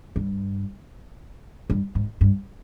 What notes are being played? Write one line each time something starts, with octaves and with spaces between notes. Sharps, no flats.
G2
G2
G#2
G2